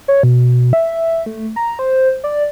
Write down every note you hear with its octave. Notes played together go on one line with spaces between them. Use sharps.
C#5
B2
E5
A3
A#5
C5
D5